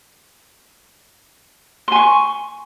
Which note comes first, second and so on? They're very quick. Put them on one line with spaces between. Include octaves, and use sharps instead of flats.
C6 G#5 C#6